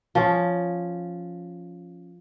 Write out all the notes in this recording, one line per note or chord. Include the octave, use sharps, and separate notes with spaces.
F3 C#4